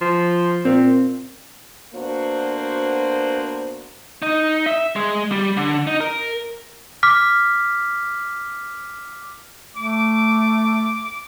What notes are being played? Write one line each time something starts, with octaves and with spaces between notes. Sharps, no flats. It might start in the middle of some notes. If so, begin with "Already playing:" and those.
F3
A#2 C4
A#3 B3 D4 F#4 C5
D#4
E5
G#3
G3
D3
D#4
A#4
D6 F6 B6
A3 D6